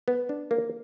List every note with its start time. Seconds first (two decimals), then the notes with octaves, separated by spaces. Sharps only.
0.08 B3
0.29 D4
0.51 A#3